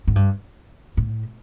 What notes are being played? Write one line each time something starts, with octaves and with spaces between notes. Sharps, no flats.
G#2
G2
A2